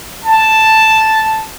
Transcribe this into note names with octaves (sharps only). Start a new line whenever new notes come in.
A5